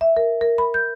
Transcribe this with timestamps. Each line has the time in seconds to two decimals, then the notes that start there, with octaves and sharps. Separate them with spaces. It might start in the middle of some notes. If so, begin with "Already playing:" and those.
0.01 E5
0.17 A#4
0.41 A#4
0.58 B5
0.74 G6